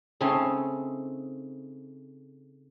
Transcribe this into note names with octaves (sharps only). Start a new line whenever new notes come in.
C#3 A3 C4 C#4 D#4